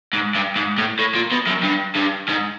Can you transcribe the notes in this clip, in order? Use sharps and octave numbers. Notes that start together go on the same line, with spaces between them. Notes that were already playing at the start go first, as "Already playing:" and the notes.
G#2
G2
G#2
A2
A2
A#2
B2
F#2
G2
G2
G#2